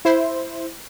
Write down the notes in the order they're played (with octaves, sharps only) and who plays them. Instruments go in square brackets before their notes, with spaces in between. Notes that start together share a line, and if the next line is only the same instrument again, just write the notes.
[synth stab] E4 C5